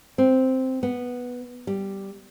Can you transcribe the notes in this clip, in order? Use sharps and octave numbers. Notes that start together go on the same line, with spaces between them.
C4
B3
G3